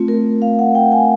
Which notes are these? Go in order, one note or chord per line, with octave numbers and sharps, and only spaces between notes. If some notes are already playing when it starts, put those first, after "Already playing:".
Already playing: A3 C4 F4
A#4
F5
F#5
G5
G#5